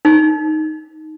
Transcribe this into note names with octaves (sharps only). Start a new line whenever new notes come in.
D#4